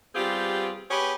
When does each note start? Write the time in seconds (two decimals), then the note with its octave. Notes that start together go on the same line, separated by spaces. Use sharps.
0.15 G3 B3 C4 F4 G4 G#4
0.91 B3 G4 G#4 B4 C#5